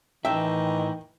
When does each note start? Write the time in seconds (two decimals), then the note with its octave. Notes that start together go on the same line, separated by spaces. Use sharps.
0.25 A2 D#3 E3 E5 G5